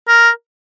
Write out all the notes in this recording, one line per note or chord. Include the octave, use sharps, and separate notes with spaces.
A#4